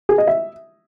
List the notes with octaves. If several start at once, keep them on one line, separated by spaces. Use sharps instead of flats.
G#4
D#5
E5